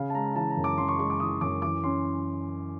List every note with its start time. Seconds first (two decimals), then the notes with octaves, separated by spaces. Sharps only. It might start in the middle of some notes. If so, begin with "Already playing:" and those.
Already playing: C#3 F5
0.10 A5
0.15 G#3 A#5
0.36 E3 A5
0.50 A#5
0.57 F#2
0.64 D6
0.78 C#3 C6
0.88 C#6
0.98 G#3 C#6
1.10 D6
1.20 E3 D#6
1.41 F#2 D6
1.62 E3 D6
1.84 C#4 C6